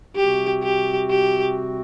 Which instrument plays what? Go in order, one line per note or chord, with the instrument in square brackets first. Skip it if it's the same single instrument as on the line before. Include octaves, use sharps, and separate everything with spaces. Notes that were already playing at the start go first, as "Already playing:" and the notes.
[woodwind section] C3 G3 C4 F#4 [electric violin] G4
[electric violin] G4
G4